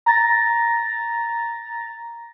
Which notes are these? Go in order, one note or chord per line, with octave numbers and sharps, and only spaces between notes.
A#5 A6 A#6